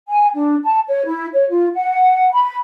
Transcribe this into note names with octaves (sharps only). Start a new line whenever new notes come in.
G#5
D4
A5
C#5
E4
C#5
F4
F#5
B5